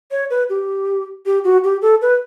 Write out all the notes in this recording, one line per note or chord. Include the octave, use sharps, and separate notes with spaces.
C#5
B4
G4
G4
F#4
G4
A4
B4